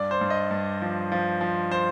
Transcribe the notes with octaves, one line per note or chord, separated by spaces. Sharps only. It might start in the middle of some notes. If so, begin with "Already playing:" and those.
Already playing: G2 D5
C5
G2
D#5
G2
F3
F3
F3
C5